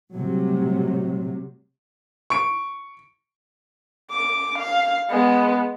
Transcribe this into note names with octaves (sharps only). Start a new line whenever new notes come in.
A2 C3 F#3 G3
C#6 D7
D6
F5
G#3 B3